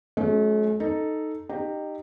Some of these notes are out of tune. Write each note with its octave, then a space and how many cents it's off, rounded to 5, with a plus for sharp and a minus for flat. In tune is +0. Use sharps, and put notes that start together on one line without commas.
F#3 -10 A3 -45 C#4 +0
D#4 +0 A4 +0
D#4 -20 G4 +0